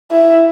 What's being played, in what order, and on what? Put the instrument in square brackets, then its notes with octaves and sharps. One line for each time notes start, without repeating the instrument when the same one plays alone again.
[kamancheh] E4